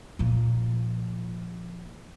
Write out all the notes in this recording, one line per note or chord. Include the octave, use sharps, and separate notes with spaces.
A#2 F3